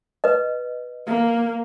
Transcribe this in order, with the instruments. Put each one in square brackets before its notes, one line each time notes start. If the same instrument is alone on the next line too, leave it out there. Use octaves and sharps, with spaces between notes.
[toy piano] B4 D#5
[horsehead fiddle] A#3